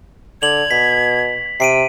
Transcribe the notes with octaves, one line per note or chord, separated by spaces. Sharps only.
D3 G#6 F7 F#7
B2 B6
C3 G5 C7 D7 D#7